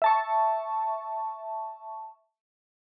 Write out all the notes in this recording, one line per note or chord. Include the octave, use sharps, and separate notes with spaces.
E5 A5 C#6